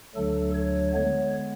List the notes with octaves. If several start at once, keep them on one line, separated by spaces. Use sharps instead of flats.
D2 D3 F#3 A3 D4 A4
C#5
D3 G#3 B3 C#5